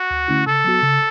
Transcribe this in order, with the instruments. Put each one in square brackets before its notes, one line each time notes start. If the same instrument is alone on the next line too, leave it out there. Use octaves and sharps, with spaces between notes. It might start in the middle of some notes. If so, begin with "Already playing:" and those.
Already playing: [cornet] F#4
[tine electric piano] D2
D3 A3 C#4 E4
[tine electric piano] C#3 [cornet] A4
[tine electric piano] F#3 B3 F#4
C#3